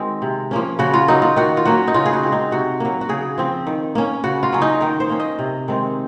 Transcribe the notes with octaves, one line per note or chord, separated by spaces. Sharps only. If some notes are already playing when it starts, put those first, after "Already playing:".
Already playing: D#3 G#3 C4 F#4
C3
F3 A#3 C#4
C#3 F#4
F4
F#3 A#3 D#4
F4
D#3 F#4
F4
F#3 A#3 C#4 F#4
D#4
C#3 F4
G#4
F#4
G#3 C4
D#4
C3 F#4
F#3 A#3
F#4
C#3 G#4
F3 C4
D#3
A#3 C#4
C#3 F#4
F4
F#3 C#4
D#4
D#3 A#4
C5
A#3 C#4
D#5
C3
D#3 G#3 C4